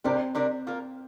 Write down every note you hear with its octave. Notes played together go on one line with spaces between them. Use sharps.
C3 G3 C4 D4 A#4 D5
C3 G3 D4 A#4 D5
A#3 F4 A#4